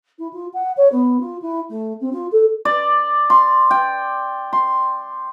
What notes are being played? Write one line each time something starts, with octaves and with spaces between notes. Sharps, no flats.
E4
F4
F#5
C#5
B3
F4
E4
A3
C4
F4
A4
D5
C6
G5
C6